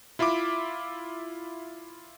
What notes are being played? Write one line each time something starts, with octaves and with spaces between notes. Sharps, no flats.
E4 F4 E5 B5 D6